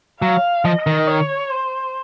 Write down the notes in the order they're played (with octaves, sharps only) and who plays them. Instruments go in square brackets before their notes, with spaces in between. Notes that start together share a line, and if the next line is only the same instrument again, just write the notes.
[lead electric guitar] F#3 [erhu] F5
[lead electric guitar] F3 [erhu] D#5
[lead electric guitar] D#3
[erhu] C#5
C5